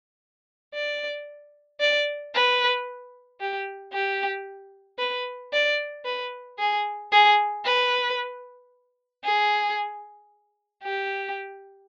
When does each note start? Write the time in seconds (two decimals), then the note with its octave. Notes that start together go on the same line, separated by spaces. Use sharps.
0.74 D5
1.80 D5
2.35 B4
3.40 G4
3.93 G4
4.99 B4
5.53 D5
6.05 B4
6.59 G#4
7.12 G#4
7.65 B4
9.25 G#4
10.84 G4